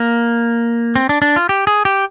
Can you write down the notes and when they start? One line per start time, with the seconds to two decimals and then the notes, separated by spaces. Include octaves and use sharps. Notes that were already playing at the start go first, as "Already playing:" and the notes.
Already playing: A#3
0.95 C4
1.09 D4
1.22 D4
1.36 F4
1.49 G4
1.67 G#4
1.85 G4